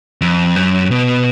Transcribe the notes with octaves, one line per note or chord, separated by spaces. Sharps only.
F2
F#2
B2